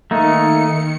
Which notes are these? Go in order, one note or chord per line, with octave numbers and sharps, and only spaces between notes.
D#3 A3 A#3 D#4 C#7